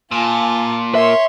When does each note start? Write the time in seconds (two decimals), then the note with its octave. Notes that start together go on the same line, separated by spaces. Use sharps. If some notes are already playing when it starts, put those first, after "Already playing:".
0.12 A#2 F4 G#5 A5
0.95 A#4 C#5 E5 C6